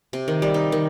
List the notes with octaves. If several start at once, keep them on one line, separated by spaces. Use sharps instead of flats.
C3
D#3
G3
D#4
D#3